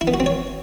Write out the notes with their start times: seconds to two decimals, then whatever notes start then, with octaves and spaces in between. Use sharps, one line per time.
0.01 E4
0.07 B3
0.14 F#4
0.20 C4
0.26 C#5